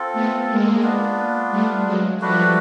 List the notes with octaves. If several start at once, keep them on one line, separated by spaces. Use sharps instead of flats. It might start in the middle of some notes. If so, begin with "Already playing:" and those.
Already playing: C4 F4 A4
A3 B3
G#3 A#3
B3 D4 F4
G3 A3
F#3 G#3
F3 G3 A3 D4 F#4 B4